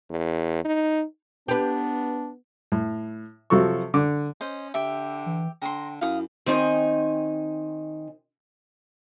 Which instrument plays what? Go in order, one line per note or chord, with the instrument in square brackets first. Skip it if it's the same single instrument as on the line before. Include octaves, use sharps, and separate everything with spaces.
[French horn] E2
D#4
[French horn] B3 [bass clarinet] D4 [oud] G4 B4
[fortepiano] A2
C3 F3 F#3 A4 C#6
D3 D6
[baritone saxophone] C#4 [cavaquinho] C5 D#5
[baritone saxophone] D3 [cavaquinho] G4 E5
[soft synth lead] E3
[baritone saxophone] D3 [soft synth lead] G5 [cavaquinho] A#5 C6
[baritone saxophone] F#2 [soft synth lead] E4 [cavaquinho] F5 D#6
[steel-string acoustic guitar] D#3 C4 D#4 G#5